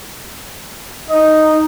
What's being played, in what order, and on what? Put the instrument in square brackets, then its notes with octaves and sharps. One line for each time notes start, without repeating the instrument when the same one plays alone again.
[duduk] D#4 [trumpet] D#5